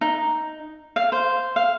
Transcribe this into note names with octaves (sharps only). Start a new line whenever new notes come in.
D#4
F5
C5
F5